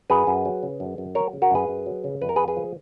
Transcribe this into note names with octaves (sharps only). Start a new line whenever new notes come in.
F#2 G#4 B4
F#2
F#3
C#3
F#2
F#2
F#3 A#4 C#5
C#3
F#4 A#4
F#2 G#4 B4
F#2
F#3
C#3
F2 B4
A#4
F2 G#4 B4
G#4 B4
F3